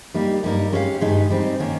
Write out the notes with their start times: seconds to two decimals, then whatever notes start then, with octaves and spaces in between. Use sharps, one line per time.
0.14 G3 A#3 D#4 G4
0.43 G2 G3 A#3 D#4 A#4
0.72 G#3 C#4 G4 C#5 F5
1.01 G2 D#3 G#3 D#4 G4
1.30 G3 C4 D#4
1.59 D#3 A#3 C#4